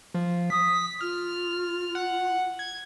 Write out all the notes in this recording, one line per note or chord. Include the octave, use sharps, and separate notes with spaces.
F3
D#6 B6
F4 F6
F#5
G#6